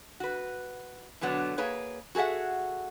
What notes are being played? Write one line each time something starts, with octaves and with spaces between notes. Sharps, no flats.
F#4 B4
B2 D3 F#3 B3 D4
A#3 G#4 B4 C#5
F#4 G#4 A4 E5 F#5